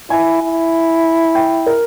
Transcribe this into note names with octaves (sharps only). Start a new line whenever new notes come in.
E4 G#5
E4
G5
A#4